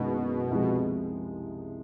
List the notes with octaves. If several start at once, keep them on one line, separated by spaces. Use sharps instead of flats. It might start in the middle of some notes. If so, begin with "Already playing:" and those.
Already playing: F#1 F#2 B2 D#3 G#3 B3
C2 C3 F3 G#3